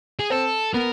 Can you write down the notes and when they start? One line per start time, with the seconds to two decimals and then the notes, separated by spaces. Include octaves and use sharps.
0.19 G#4
0.30 C4 A4
0.74 B3 A#4